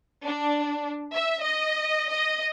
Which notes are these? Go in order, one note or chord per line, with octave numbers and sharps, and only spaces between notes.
D4
E5
D#5
D#5